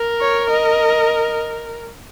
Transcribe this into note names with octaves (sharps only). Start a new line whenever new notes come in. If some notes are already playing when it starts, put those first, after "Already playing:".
Already playing: A#4
C#5
D#5